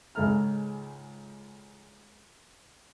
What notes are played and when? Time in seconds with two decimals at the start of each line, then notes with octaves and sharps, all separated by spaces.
0.15 C#2 G#2 G#3 A4 A#5 F6